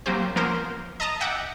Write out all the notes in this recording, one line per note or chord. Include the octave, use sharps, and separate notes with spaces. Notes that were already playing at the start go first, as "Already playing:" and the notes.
F#3 A#3 C4 G4 C5
F3 A#3 B3 C#4 A#4 C5
D#5 A5 A#5 D#6
D#5 E5 F#5 G5 D6